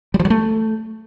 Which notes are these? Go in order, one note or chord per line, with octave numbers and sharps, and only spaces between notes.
G3
F3
F#3
A3